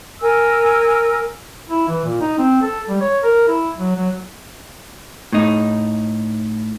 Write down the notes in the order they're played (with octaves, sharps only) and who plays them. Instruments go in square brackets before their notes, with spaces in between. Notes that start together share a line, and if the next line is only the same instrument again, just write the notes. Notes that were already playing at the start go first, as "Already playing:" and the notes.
[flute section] A#4 G#5 E6
[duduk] E4
E3
A#2
D#4
C4
A4
G3
C#5
A#4
E4
F#3
F#3
[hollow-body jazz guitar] A2 D#4